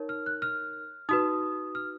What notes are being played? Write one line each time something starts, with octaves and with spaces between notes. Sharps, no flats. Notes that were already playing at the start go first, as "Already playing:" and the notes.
Already playing: D#4 A#4 C#5
F6
F#6
F6
D#4 F#4 B4 D#6
F6